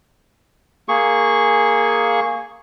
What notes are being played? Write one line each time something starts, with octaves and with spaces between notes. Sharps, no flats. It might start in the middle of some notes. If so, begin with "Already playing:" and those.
A#3 G#4 C#6